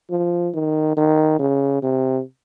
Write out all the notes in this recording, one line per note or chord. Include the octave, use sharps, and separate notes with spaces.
F3
D#3
D#3
C#3
C3